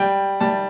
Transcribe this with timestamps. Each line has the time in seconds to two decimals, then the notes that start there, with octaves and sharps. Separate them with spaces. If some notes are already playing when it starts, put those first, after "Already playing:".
Already playing: G3 G5
0.40 G3 A5